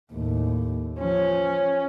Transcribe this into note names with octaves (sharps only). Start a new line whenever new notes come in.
D#2 A2
F3 C#4